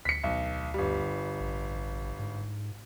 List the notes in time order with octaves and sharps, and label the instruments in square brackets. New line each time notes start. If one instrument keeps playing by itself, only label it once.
[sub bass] D2 [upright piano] B6 C#7
[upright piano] B1
G1 G3
[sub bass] A1
G#2